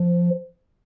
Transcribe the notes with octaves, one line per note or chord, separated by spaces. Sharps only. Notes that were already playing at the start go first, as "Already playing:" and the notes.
Already playing: F3